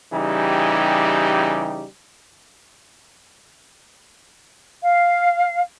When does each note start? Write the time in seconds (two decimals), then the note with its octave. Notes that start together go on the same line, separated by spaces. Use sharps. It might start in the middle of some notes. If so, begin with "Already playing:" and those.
0.13 C#3 E3 G3 D#4 G4
4.82 F5